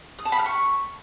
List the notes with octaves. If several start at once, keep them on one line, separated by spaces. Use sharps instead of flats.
D#6
A5
B5
F6
C#6